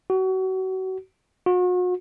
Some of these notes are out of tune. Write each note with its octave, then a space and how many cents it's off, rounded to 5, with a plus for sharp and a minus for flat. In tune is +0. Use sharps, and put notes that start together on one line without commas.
F#4 +30
F#4 -40